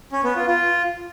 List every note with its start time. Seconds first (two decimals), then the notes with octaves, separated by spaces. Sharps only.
0.12 C#4
0.24 B3
0.36 F4
0.48 F4